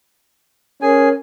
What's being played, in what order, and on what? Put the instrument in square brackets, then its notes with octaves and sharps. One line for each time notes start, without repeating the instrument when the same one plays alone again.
[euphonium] C#4 [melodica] G#4 G#5 [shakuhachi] A#4